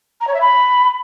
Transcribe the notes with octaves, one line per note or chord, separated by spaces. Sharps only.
A#5
C#5
E5
B5